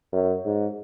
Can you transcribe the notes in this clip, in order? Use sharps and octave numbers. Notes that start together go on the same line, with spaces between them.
F#2
G#2